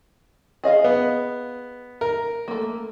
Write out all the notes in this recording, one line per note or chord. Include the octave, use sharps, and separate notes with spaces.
G#4 D#5 F5
B3
A#4
A3 A#3